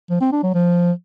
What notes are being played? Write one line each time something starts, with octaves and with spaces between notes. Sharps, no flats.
F3
C4
D4
F#3
F3